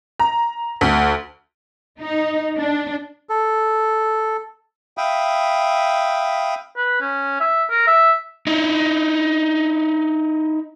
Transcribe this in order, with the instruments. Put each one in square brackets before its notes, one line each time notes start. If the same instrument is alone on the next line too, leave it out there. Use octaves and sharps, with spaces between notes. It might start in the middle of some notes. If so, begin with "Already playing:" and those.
[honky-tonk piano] A#5
D2
[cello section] D#4
D4
[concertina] A4
[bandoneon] E5 F5 G5 B5 D#6
[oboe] B4
C#4
E5
A#4
E5
[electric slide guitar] D#4 E4